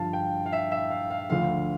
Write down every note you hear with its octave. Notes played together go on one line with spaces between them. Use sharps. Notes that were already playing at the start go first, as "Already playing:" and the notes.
Already playing: G2 D3 F3 F5 A5
G5
F5
E5
E5
F5
F5
D2 D3 F3 F5